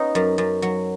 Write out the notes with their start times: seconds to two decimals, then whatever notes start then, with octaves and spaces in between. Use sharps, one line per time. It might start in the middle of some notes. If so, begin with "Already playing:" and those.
Already playing: B3 C#4 D#4
0.15 F#2
0.38 F#2
0.62 F#3